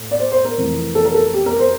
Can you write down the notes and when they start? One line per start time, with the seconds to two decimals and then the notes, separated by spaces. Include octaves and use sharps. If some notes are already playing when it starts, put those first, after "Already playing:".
Already playing: A2
0.11 D5
0.19 C5
0.32 C5
0.45 A#4
0.58 F2 C3 E3 A3
0.95 A4
1.05 A#4
1.14 A4
1.34 G4
1.46 A#4
1.60 C5